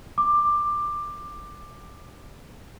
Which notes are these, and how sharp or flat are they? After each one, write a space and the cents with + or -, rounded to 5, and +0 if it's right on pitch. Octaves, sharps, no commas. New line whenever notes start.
D6 +15